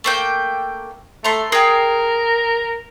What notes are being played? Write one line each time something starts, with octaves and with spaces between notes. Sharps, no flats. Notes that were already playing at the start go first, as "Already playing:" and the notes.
A3 A#3 G5
A3 A#5 C6
G#4 A#4 G5